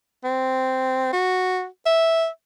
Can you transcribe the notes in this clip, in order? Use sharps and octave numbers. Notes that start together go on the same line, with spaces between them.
C4
F#4
E5